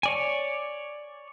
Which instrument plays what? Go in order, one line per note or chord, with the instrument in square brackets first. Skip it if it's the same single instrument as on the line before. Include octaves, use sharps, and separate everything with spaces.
[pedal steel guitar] C#5 D5 G#5